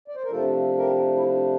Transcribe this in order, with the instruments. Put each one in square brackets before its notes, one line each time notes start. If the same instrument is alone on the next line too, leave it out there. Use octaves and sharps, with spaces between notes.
[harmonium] D5
C5
A#4
C3 F3 A3 D4 F4 A4
G4 A#4
E4
D4